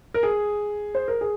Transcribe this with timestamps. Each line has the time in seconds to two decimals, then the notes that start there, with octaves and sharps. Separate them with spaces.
0.14 A#4
0.23 G#4
0.95 C5
1.08 A#4
1.21 G#4